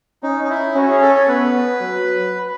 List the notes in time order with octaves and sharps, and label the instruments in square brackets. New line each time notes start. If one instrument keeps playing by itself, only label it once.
[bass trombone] C#4 [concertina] D#4
[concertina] D#4
E4
[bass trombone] C#4 [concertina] F#4
[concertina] G#4
A4
C#5
[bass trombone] B3 [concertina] B4
[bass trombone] F#3